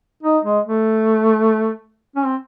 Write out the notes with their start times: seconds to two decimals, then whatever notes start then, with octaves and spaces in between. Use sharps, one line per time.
0.23 D#4
0.44 G#3
0.66 A3
2.16 C#4
2.26 C4